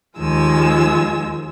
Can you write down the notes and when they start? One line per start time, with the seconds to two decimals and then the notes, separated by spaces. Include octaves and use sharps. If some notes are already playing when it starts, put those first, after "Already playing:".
0.18 D#2 F3 G#3 E6